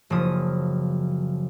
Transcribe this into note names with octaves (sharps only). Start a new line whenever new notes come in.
F#1 C#3 F3 D#6